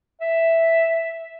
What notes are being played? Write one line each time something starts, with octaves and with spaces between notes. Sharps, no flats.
E5